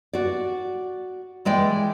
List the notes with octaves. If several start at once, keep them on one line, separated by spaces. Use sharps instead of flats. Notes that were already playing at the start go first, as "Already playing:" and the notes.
F#4 D5
E3 G#3 D5 G5